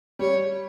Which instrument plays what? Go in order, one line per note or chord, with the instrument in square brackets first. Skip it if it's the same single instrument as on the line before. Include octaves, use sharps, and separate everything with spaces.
[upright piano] G3 [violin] C#5